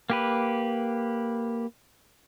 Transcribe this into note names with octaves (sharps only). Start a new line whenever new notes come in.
A#3 G4 B4